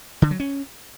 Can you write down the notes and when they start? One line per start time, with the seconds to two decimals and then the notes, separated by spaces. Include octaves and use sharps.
0.22 D3
0.31 F#3
0.40 C#4